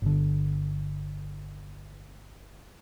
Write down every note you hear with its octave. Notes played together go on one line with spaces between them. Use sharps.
G1 D3